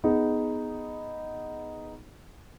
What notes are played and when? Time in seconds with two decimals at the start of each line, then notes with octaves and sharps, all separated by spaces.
0.04 B3 D#4 G#4